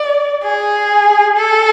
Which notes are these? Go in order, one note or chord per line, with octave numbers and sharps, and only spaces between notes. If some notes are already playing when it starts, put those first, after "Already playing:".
Already playing: D5
G#4
A4